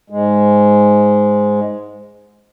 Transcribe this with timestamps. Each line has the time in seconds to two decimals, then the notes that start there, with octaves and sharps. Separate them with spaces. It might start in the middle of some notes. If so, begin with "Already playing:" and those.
0.10 G#2 G#3